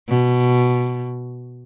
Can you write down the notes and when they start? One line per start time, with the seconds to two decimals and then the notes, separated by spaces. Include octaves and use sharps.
0.08 B2